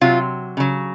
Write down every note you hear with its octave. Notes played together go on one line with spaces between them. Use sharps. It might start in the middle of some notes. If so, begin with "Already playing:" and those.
C3 F#3 F4
C#3 F#3